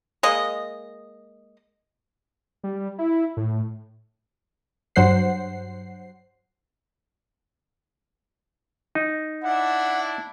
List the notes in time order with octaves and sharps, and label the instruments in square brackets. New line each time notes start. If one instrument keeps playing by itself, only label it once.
[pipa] G#3 A#3 D#5
[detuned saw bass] G3
E4
A2
[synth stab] G2 F#3 C5 F#5 C7
[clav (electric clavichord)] D#4
[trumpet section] D4 E4 [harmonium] F#5